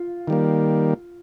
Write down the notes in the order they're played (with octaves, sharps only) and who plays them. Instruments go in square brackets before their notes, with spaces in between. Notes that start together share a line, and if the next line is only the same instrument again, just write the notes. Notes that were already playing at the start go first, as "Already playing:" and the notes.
Already playing: [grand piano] F4
[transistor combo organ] D#3 G3 A#3